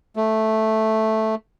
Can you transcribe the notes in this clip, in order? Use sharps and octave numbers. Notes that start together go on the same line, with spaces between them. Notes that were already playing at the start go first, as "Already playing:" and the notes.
A3